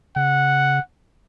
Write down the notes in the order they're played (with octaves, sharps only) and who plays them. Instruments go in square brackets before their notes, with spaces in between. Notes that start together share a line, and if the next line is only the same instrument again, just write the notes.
[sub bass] C#3 [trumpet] F#5